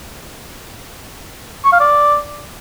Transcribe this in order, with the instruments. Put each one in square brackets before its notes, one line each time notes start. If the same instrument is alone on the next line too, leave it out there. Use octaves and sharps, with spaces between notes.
[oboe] C#6
F5
D5